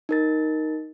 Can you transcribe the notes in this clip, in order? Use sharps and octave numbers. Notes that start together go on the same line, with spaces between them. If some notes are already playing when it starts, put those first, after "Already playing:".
D#4 A#4 A6